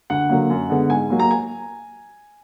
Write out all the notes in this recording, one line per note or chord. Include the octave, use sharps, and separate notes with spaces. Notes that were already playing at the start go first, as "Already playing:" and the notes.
D2 F#5
D3 F#3 A#3
F#2
D3 G#3 B3
G#2 G#5
F#3 A#3
A#5
G#5